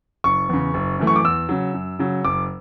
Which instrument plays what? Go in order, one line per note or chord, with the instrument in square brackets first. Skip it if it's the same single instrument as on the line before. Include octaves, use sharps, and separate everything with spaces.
[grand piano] F#1 C#6
E2 C#3
F#1
F#2 E3 A3
C#6
D6
E2 E6
C#3 F#3
F#2
C#3 F#3
F#1 D6